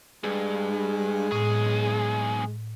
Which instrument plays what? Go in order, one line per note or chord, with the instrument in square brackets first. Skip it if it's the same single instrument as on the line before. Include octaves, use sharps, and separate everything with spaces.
[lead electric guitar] G2 [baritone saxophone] G#3
[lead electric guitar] B1 G#4 [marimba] A2